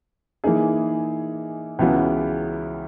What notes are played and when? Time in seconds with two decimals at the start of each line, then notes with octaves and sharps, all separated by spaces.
0.44 E3 A#3 D#4 G#4
1.79 C#2 C#3 E3 B3 F#4